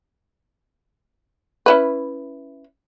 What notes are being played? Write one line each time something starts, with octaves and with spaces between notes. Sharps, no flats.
C#4 E4 B4